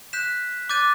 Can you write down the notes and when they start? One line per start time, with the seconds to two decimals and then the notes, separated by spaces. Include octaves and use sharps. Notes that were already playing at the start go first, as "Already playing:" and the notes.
0.13 F#6 G6 B6 E7
0.69 D6 F#6 G6 A6 D#7